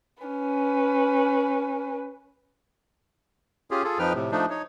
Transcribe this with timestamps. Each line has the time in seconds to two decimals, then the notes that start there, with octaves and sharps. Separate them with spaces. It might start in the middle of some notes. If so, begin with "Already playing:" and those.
0.23 C#4 B4
3.71 C#4 F4 G4 G#4
3.84 F4 G#4 A4
3.99 F2 F3 D#4 B4 G5 F6
4.14 A2 C3
4.32 F3 A3 D4 D#4
4.50 D#4 C#5